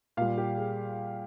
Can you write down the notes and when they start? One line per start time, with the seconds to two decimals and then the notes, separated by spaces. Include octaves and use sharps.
0.17 A#2 G3 F5
0.38 G4
0.57 G#4